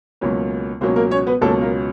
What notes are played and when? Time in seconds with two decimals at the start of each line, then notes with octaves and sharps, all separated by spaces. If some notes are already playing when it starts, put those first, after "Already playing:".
0.21 C#2 B2 F#3 A#3 C#4
0.81 C#2 B2 F#3 A#3 C4 C#4 C5
0.96 A#3 A#4
1.11 C#4 C#5
1.27 B3 B4
1.41 C#2 B2 F#3 A#3 C#4 A4
1.61 A#3 A#4